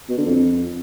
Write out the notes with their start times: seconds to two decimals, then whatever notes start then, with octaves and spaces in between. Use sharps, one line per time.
0.09 B2
0.18 D3
0.26 F2